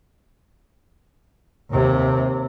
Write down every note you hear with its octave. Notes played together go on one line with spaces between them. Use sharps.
D#2 C3